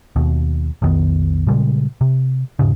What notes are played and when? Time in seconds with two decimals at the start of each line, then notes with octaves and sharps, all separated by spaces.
0.16 D#2 B2
0.82 B1 F2 D#3 B3
1.47 A#2 C#3 G3 G#3
2.01 C3
2.59 E1 G#2 C#3